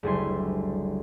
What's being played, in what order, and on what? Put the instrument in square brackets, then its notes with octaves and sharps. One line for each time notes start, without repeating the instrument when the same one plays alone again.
[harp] F#1 D2 G3 E4 G#5 C6